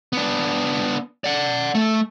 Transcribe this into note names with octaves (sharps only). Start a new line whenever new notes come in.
B3 D4
D5 F#5
A3